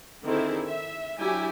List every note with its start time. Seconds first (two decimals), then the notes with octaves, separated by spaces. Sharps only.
0.25 D3 D#3 C4 D#4 E4 G#4
0.67 E5
1.19 F#3 D4 E4 G4 G#5